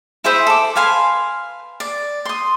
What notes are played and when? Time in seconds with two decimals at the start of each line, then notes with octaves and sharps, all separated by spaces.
0.24 E4 G#4 C5 E5
0.47 A4 D6
0.76 B4 F5 G#5 C6
1.80 D5
2.25 C6 D#6